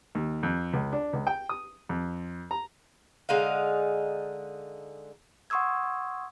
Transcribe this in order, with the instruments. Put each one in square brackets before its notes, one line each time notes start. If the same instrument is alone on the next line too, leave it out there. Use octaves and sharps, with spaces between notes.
[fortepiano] D#2
F2
C#2
D4
C#2
G5
D#6
F2
A#5
[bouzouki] D3 G#3 D#4 F5
[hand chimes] F#5 C6 C#6 D#6 E6 G#6